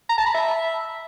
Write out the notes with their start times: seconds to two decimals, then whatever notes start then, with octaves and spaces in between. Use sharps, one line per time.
0.10 A#5
0.18 A5
0.26 B5
0.35 E5